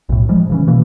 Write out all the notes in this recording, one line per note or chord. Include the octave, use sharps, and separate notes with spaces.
B1 A2
F3 G3 G#3
C#3 E3 C#4
B2 E3 A#3